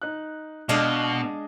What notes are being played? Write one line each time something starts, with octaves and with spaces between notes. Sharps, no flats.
D#4 F#6
B2 G#3 D4 D#5 F5